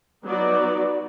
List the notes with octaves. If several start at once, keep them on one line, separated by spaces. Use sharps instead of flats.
F#3 B3 D#4 F#4 D5